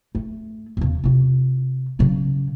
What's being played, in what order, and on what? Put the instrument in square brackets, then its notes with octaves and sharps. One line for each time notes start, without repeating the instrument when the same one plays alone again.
[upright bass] A3
E2 C#3
C3 F4
C#3 F#3